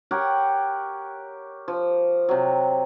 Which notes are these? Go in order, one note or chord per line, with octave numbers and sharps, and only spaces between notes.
G4 A#4 C#5 F#5
F3
C3 F#3